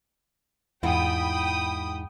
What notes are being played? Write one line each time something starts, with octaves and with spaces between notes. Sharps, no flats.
E2 G#2 E4 F4 G5 B5 D#6